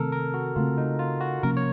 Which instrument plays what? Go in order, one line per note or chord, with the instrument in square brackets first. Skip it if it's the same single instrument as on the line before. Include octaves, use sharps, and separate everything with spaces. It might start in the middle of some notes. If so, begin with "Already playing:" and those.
Already playing: [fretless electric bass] C3 D#3 A3 C4 [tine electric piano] A4 A#4
[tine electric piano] A#4
F#4
[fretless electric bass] C#3 A3 C4 [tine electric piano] F4
[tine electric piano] D#4
F4
F#4
[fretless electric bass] C3 F3 A#3 C#4 [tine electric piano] A#4
[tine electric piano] C#5